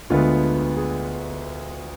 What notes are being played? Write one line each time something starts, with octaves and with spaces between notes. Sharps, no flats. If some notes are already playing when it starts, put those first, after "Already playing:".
D2 D3 G#3 B3 F4
G#4